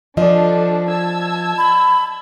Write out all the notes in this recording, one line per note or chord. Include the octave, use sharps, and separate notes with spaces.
F3 D4 A4 D5 D#5
A5 E6 G#6
B5